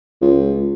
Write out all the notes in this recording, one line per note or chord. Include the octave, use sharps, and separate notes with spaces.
C#2